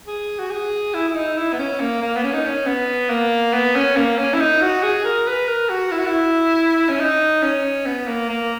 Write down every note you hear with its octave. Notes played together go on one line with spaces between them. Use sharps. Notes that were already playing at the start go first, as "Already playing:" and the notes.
G#4
F#4
G#4
E4
E4
D#4
E4
B3
C#4
A#3
A#3
B3
C#4
D#4
C#4
B3
A#3
B3
C#4
A#3
C#4
E4
D#4
F#4
G#4
A#4
B4
A#4
F#4
E4
F#4
E4
C#4
D#4
C#4
B3
A#3
A#3